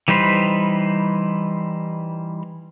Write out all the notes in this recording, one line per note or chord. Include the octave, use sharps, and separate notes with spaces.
E3 G3 D#4 B4 C5